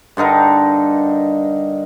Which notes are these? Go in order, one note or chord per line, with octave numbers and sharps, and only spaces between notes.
G2 D3 D#4 A#4